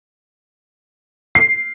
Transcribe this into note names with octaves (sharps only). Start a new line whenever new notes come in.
C7